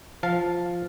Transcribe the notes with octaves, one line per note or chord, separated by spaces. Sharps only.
F3 F5 A5